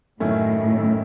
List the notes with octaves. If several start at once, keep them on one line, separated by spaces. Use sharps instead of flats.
F#2 A2 D#3 A3 C#4 E4
F#2 D#3 A3 C#4 E4